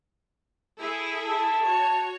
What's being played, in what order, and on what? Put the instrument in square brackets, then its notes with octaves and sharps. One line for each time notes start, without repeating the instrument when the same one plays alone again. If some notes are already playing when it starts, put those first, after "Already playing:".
[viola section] E4 G#4 A4
[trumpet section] A5
[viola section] F#4 C#5